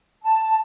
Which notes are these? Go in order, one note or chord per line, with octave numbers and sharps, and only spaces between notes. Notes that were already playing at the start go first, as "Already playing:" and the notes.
A5